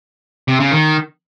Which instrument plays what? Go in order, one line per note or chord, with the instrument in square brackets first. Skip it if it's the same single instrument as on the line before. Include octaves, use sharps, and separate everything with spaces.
[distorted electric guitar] C3
C#3
D#3